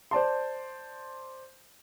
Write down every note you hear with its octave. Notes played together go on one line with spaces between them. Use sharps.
C5 D5 A5 C6